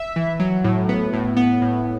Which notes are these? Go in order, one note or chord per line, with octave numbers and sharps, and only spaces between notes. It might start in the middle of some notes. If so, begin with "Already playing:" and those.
Already playing: E5
E3
F#3
A2
B3
A2
B3
A2